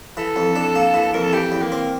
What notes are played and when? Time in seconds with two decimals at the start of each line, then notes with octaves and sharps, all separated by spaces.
0.17 E3 A4
0.36 F2
0.56 D4
0.75 A#3
0.94 E3
1.13 F2 A#4
1.23 A4
1.33 E3 G4
1.52 E2
1.62 A#3
1.72 C4